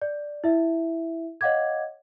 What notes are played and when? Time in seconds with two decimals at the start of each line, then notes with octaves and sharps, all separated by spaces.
0.02 D5
0.44 E4 E5
1.41 C#5 D#5 F5 F#5 D6 G#6